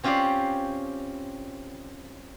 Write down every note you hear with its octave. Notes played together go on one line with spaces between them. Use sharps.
C4 C#4 F4 G4 C5 D5